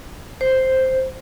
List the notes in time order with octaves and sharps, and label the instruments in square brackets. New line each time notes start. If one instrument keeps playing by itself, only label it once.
[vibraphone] C5